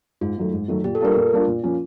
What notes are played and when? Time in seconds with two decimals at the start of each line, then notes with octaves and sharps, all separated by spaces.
0.21 G#2 F4
0.38 D#3 F#3 A3
0.53 G#2
0.68 D#3 F#3 A3
0.84 A#2 G4
0.95 A4
1.01 G3 A#3 D4 F4 A#4
1.16 A#2
1.32 G3 A#3 D4 F4
1.47 A#2
1.63 F3 A#3 C#4